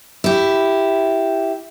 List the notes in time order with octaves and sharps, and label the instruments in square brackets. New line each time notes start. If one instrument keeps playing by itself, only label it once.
[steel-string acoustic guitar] E4 G4